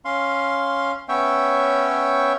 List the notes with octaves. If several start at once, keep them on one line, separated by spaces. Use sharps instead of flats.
C#4 F5 C6
B3 C#4 C#5 E5 G5